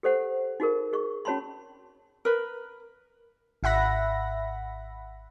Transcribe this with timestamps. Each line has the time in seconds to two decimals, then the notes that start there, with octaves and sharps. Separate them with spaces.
0.03 G4 A4 C5 F#5
0.60 D#4 F#4 G#4 A#4
0.93 G#4 C#6
1.25 C#4 F#4 C#5 A5 B5 C6
2.25 A#4 B4
3.63 G#1 E5 F#5 B5 A#6